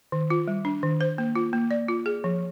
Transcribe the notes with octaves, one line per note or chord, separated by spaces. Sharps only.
D#3
F4
G3
D4
D#3
C5
A#3
F4
A#3
D5
F4
G#4
F3